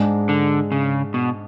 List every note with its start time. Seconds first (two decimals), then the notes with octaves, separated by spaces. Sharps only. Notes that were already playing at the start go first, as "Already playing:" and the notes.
Already playing: G#2 G#3 D4 G#4
0.29 D3
0.72 C#3
1.14 B2